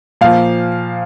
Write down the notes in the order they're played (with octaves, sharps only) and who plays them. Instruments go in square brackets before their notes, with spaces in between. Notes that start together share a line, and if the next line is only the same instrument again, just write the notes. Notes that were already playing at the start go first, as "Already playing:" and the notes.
[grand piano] A#2 F3 F5